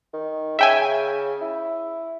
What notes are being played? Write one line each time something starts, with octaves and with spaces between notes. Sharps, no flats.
D#3
C#3 E5 G5 G#5
E4